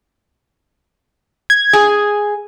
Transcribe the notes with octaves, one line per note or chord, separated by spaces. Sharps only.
G#6
G#4